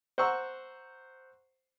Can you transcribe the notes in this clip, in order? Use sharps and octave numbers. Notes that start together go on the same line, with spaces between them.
C5 F#5 A#5 C#6 E6